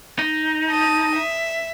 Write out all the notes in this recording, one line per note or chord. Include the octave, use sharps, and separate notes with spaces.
D#4
A5 D#6
E5